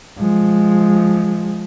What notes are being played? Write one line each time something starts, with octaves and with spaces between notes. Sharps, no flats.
F3 G#3